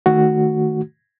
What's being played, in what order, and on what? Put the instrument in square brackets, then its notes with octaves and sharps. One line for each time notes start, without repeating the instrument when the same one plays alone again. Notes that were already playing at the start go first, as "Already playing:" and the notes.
[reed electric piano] D#3 A3 F#4